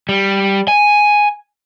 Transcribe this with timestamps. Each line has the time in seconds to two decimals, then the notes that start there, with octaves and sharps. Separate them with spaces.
0.09 G3
0.68 G#5